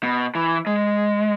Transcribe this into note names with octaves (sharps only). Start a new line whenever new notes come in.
B2
E3
G#3